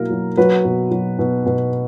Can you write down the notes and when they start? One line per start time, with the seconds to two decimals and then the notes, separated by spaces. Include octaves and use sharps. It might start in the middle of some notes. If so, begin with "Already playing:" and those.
Already playing: B2 F#3 A#3 E4 A#4
0.10 F#3
0.37 F#3 B4
0.65 B2
0.91 F#3
1.19 B2
1.46 B2